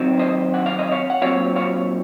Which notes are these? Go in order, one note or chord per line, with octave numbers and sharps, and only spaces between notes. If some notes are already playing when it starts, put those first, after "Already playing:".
Already playing: D#3 F#3 C4 D#4
C5 D#5
F#5
F5
D#5
C#5 F5
F#5
A#2 F#3 C4 C#5 F5
C#5 F5